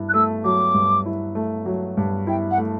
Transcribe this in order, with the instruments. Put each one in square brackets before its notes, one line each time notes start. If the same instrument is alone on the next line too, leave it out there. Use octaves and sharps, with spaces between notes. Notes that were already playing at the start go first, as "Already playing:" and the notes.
Already playing: [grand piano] G2 E4
[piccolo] F#6
[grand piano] A3 [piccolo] E6
[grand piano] F#3 [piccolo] D6
[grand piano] G2
E4
A3
F#3
G2
[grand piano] E4 [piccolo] G5
[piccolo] F#5
[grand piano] A3